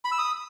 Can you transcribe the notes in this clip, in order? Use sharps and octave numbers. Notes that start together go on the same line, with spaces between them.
B5
E6
D#6